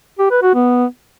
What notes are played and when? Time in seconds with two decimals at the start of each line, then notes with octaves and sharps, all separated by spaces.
0.19 G4
0.31 B4
0.42 F#4
0.54 B3